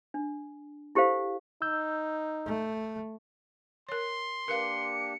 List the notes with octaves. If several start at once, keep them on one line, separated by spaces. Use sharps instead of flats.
D4
E4 G4 A4 C5 F5
D#4 E6 G6
A3
A#4 C#5 C6
A#3 D4 G4 A#4 B4 F5 C#7